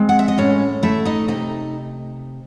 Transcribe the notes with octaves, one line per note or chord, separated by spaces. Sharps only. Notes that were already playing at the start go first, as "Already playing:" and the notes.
Already playing: G#3 C4
F#5
E5
D#5
A2 C#4 C#5
A3 E4 E5
D#4 D#5
C3 D#4 D#5